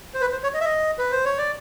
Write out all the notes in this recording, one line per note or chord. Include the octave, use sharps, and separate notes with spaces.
C5
B4
C5
C#5
D#5
E5
D#5
B4
C5
C#5
D5